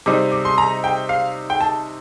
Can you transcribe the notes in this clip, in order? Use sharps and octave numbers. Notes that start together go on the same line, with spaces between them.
C3 G3 C4 D#4 D6
D6
C6
A#5
G5
F5
G5
A5